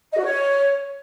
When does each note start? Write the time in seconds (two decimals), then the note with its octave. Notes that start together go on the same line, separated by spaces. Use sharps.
0.11 D#5
0.17 F#4
0.23 C#5